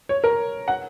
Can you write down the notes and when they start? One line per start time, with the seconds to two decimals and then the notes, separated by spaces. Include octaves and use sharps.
0.09 C#5
0.24 A#4
0.68 F#5